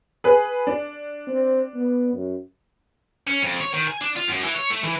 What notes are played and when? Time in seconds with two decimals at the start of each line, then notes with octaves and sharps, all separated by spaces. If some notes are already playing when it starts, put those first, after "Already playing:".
0.24 G#4 B4
0.67 D4
1.27 C4
1.74 B3
2.13 F#2
3.27 C#4
3.43 F2
3.61 C#5
3.74 D#3
3.88 G#5
4.01 D4
4.16 F4
4.28 F#2
4.43 E3
4.55 C#5
4.70 A3
4.84 E3